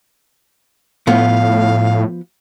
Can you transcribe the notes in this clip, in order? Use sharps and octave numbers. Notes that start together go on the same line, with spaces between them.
A2 F3 B3 F5